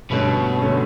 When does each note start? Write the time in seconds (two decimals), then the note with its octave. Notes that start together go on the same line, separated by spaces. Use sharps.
0.11 G2 B2 D3 A3 C#4
0.62 D3 A3 C#4